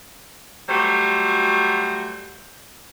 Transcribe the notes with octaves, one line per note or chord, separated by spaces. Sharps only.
F#3 G3 A3 F#4 C5